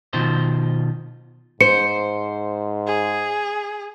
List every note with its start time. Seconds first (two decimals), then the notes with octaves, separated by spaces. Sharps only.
0.13 B2 D#3 F3 C5
1.61 G#2 C5 C#7
2.87 G#4